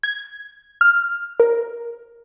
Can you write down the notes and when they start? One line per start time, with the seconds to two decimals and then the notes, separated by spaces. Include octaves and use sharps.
0.03 G#6
0.81 F6
1.40 A#4